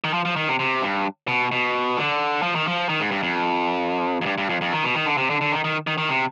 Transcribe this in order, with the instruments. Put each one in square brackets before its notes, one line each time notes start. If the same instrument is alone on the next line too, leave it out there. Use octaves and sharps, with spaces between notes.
[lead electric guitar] D#3
F3
F3
D#3
C3
C3
G2
B2
B2
D3
F3
D#3
F3
D#3
G#2
G2
F2
F2
G2
G2
F2
F2
D#3
B2
D#3
D3
C3
D3
D3
D#3
D#3
D#3
D#3
C3